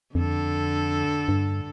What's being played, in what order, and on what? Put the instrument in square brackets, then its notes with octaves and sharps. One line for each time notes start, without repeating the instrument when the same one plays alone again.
[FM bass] F2 [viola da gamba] D3 A4
[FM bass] G2